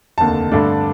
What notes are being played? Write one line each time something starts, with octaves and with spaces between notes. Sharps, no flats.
F1 D#2 D3 A5
G2 D3 A3 D4